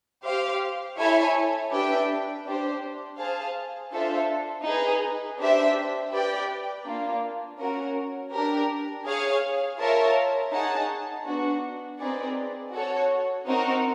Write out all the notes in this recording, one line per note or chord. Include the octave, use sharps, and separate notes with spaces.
G4 C5 F5
E4 A4 C#5 E5 G#5
D4 G4 B4 E5 G5
D4 G4 C5
G#4 C5 F5 A5
D4 F4 A4 C5 E5
D#4 G#4 B4
D4 G4 C5 E5
G4 B4 D5 G5
A#3 D4 F4
C#4 F#4 A#4
D4 G4 A#4
G#4 C#5 F5
F4 A#4 C#5 E5 A5
D#4 G#4 C#5 F#5 A5
B3 D4 F#4
C4 D#4 G#4 B4 D5
F#4 A4 C#5
C4 D#4 F#4 A#4